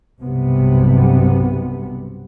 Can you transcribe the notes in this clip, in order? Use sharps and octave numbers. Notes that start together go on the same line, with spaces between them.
B1 G2 C3 B3